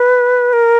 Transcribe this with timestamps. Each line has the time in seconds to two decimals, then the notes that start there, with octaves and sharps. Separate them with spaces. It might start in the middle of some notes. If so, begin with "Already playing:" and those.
Already playing: B4
0.53 A#4